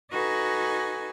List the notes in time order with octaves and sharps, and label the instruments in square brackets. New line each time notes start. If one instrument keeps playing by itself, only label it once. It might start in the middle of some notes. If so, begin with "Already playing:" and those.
[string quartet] D#4 F#4 A4 B4 G#5